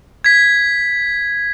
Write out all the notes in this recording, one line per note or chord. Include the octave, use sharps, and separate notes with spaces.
G#6 B6